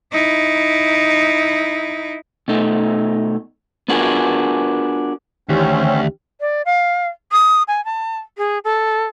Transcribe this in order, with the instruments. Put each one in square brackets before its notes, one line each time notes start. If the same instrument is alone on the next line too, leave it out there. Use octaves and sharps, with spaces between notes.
[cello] D#4 E4
[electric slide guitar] B2 A3 D#4
B3 D4 F4 F#4 G#4 A#4
[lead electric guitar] D2 [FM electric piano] D#3 E3 G4 [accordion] C4 C#4
[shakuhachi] D5
F5
D#6
G#5
A5
G#4
A4